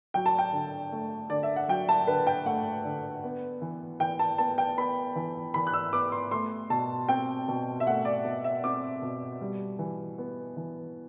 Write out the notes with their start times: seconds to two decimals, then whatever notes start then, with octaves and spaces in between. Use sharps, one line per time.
0.14 F#3 G5
0.26 A5
0.39 G5
0.53 D3
0.92 A3
1.30 D3 D5
1.43 E5
1.56 F#5
1.68 F#3 G5
1.89 A5
2.07 D3 B4
2.27 G5
2.46 A3 F#5
2.85 D3
3.24 B3
3.62 E3
4.00 E3 G5
4.19 A5
4.38 B3 A5
4.58 G5
4.78 B3 B5
5.16 E3
5.54 E3 B5
5.67 F#6
5.73 E6
5.93 B3 D6
6.12 C6
6.31 A3 C6
6.70 B2 A5
7.09 C4 G5
7.48 B2
7.80 E5
7.87 A3 F#5
8.05 D5
8.24 B2
8.44 E5
8.64 C4 D6
9.02 B2
9.41 G3
9.79 E3
10.18 B3
10.57 E3